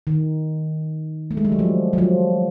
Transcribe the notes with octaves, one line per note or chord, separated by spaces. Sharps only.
D#3
A3
G#3
G3
F#3
F3
F#3
F3